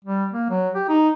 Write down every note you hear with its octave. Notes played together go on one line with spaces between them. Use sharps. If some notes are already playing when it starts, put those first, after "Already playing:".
G3
A#3
F#3
G4
D#4